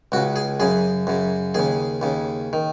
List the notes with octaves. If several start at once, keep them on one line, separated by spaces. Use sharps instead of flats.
C#2 C#3 F#4
G#4
F#2 C#3 G#4
F#2 C#3
D#2 C#3 G#4
D#2 C#3
D#3